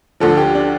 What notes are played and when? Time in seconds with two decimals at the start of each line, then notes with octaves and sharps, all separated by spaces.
0.20 D2 D3 F3 A4
0.37 G4
0.55 D4